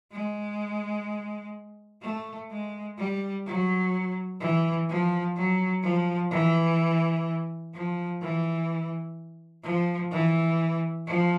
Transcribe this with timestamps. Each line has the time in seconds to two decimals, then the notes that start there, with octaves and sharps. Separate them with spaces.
0.12 G#3
2.02 A3
2.50 G#3
2.98 G3
3.46 F#3
4.41 E3
4.89 F3
5.36 F#3
5.83 F3
6.31 E3
7.74 F3
8.22 E3
9.64 F3
10.12 E3
11.07 F3